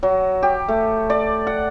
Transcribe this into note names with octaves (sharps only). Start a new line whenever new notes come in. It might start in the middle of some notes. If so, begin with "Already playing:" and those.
F#3
G4
A3
D5
F#5